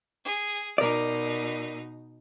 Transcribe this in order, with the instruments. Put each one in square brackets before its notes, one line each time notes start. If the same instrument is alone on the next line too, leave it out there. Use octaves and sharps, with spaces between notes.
[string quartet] G#4
[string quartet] B2 D#4 [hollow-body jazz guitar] A#4 D5